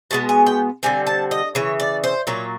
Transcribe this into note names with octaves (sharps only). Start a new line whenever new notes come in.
B2 G#3 B3 A5
G#5
G5
D3 G3 C4 G#5
A5
D#5
C#3 E3 C#5
D5
C5
A#2 F#3 A#3 C#5